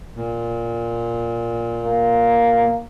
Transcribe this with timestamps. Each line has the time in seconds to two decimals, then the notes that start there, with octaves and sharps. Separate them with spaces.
0.16 A#2
1.84 A#3